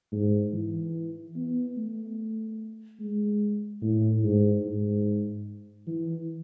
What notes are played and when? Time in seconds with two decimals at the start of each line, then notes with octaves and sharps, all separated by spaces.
0.12 G#2
0.53 E3
1.36 B3
1.77 A3
3.00 G#3
3.81 A2
4.23 G#2
4.64 G#2
5.87 E3